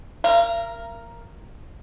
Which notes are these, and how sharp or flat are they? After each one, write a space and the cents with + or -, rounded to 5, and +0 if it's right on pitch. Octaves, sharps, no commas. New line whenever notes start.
A#4 +0 F5 -45